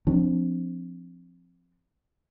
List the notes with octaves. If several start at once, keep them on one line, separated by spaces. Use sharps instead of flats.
F3 C4 D4